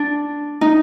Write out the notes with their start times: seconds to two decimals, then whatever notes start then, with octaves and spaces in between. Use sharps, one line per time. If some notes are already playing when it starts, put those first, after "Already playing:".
Already playing: D4
0.61 D#4